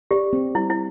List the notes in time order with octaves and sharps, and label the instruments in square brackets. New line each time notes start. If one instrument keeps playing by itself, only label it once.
[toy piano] G4 [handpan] D5
[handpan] C4
[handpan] G3 [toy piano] E4
[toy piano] E4